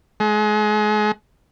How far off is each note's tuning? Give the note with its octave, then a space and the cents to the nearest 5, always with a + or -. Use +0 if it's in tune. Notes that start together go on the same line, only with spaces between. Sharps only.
G#3 +30